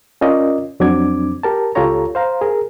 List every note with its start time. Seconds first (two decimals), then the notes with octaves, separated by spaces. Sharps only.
0.21 C#4 F4 A#4 D5 D#5
0.80 F2 F#3 C4 D4 D6 G#6
1.43 G4 A#4 A5
1.75 C#2 F4 G4 A4 C#5 A#5
2.15 C5 F5 A#5
2.41 G#4 A#4